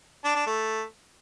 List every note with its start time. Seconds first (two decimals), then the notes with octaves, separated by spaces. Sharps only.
0.24 D4
0.35 D4
0.47 A3